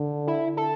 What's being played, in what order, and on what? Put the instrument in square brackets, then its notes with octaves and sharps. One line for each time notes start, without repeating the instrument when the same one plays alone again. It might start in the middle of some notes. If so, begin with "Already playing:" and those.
Already playing: [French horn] D3
[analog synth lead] E4
A4